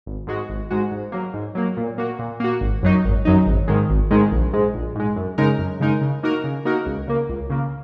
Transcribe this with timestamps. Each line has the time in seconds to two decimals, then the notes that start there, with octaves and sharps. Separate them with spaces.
0.06 G#1
0.27 G#2 G#3 F#4
0.49 G#1
0.70 G#2 G#3 F#4
0.91 G#2
1.12 F#3 A#3
1.34 G#2
1.55 F#3 A#3
1.77 A#2
1.98 A#3 F#4
2.19 A#2
2.40 A#3 F#4
2.61 G#1
2.83 F#2 F#3 D#4
3.05 G#1
3.25 F#2 F#3 D#4
3.46 G#1
3.68 G#2 D#3 G#3
3.90 G#1
4.11 G#2 D#3 G#3
4.32 A#1
4.53 G#2 G#3
4.74 A#1
4.95 G#2 G#3
5.16 F#2
5.38 C#3 G#3 D#4 A#4
5.58 F#2
5.80 C#3 G#3 D#4 A#4
6.01 C#3
6.23 A#3 D#4 F#4 A#4
6.44 C#3
6.65 A#3 D#4 F#4 A#4
6.86 C#2
7.07 C#3 A#3
7.29 C#2
7.50 C#3 A#3